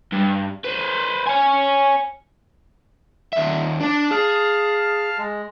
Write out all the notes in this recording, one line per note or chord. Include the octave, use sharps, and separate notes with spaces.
G2
B4 C5
C#5 G#5
D#2 E5
D4 D5 A5
G#4 F5 A5 F6
G#3